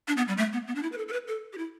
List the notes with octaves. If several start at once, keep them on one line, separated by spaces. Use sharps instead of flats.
D4
B3
G3
A3
B3
B3
D4
E4
B4
A4
A4
B4
A4
G4
E4